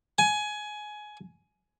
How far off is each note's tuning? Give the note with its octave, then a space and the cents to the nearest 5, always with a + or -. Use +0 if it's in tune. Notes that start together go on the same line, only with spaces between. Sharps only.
G#5 +20